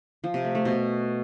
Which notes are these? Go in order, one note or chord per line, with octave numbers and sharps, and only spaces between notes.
F3
C3
A3
A3
B2